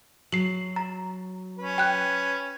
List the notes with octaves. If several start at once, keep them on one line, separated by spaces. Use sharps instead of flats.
F#3 C7 F#7
A#5
C#4 B4
G5 F#6 G6